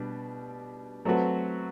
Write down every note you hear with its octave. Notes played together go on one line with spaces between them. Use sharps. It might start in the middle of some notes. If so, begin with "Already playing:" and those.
Already playing: B2 G3 D4 B4
F#3 A3 C4 F#4 B4